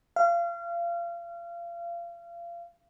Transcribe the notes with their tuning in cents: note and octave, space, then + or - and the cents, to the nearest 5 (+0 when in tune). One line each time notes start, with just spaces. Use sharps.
F5 -30